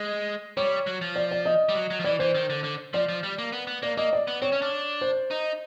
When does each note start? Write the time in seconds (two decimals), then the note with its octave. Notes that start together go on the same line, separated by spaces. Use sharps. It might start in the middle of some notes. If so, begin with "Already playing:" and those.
Already playing: G#3
0.57 G3 C#5
0.87 F#3
1.01 F3
1.16 D5
1.31 D5
1.46 D#5
1.69 G3
1.75 F#3
1.90 F#3
2.00 F3
2.04 E3 D5
2.19 E3 C5
2.35 D#3
2.50 D3
2.64 D3
2.93 F3 D5
3.08 F3
3.23 G3
3.38 A#3
3.52 B3
3.67 B3
3.82 A#3 D5
3.97 A#3 D#5
4.13 D5
4.28 B3
4.42 C4 C#5
4.52 C#4
4.62 D4
5.01 C5
5.31 D#4